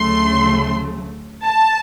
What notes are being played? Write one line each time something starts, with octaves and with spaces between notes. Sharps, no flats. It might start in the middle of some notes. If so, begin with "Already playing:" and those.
Already playing: D2 C#3 F#3 A3 C6
A5